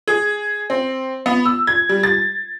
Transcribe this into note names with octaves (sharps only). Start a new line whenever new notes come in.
G#4
C4
B3
E6
G#6
G3
A6